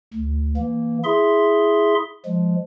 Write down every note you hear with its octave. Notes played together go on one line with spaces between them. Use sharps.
D2
E3 A#3
E4 G#4 E5 C6
F3 G#3